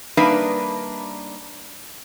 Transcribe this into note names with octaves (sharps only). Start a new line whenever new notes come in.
G3 A#3 D4 D#4 B4 E5